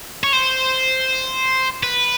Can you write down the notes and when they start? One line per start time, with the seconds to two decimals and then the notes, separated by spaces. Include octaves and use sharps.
0.23 C#5
0.33 C5
1.83 B4